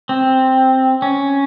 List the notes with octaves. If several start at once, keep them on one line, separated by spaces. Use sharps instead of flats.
C4
C#4